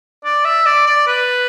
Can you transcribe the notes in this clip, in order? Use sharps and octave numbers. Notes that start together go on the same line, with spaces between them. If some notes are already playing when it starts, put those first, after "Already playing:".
D5
E5
D5
D5
B4